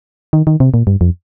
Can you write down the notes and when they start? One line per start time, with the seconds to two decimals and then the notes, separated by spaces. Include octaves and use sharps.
0.33 D#3
0.47 D#3
0.60 C3
0.74 A#2
0.87 G2
1.01 F2